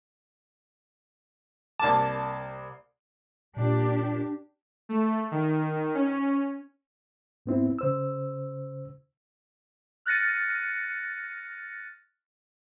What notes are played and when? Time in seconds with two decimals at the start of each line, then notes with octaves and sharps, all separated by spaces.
1.80 C2 A#3 D5 A5 D6 E7
3.57 A#2 D4 G4
4.89 A3
5.31 D#3
5.94 C#4
7.46 G#2 B3 C4 E4
7.79 C#3 C5 E6
10.06 F6 F#6 A6 A#6 C#7 D#7